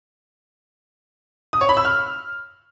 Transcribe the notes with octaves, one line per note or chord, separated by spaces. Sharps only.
D#6
C#5
B5
E6
F6